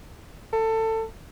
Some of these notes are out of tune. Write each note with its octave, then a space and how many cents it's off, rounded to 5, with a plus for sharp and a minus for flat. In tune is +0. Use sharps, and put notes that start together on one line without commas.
A4 +20